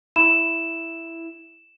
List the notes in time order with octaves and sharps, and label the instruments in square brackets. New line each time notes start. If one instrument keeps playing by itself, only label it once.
[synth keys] E4 [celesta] E7